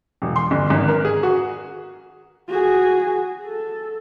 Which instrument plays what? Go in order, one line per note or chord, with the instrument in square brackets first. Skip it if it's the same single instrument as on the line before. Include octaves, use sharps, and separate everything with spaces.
[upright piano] E1
C6
G1
G#1
A#4
G#4
F#4
[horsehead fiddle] F#4 G#4
A4